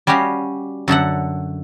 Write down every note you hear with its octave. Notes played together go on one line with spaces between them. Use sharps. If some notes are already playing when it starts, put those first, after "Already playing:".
G3 C#4 F#4 G4 D#5 F5
F#2 D3 A4 F#5